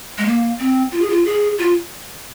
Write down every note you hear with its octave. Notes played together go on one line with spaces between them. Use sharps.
G#3
A#3
C4
F4
G#4
F4
G#4
F4